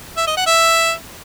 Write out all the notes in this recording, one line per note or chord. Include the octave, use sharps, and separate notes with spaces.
E5
D#5
F#5
E5